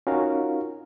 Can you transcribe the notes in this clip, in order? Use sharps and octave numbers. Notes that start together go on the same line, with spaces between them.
C#4 D#4 F4 F#4 A#4 F5